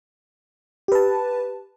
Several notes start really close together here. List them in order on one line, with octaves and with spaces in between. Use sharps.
G4 B4 A5